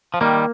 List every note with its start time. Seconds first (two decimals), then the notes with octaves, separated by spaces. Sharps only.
0.14 F3
0.21 D#3 G3 A#3